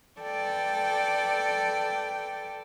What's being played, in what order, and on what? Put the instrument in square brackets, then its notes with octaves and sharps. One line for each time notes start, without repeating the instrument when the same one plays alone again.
[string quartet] A4 B4 D5 G5